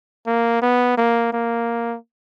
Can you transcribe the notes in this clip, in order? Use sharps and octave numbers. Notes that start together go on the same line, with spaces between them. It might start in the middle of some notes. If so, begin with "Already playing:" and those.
A#3
B3
A#3
A#3